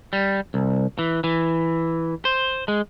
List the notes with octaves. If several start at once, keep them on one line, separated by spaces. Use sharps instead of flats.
G3
C2
E3
E3
C5
G#3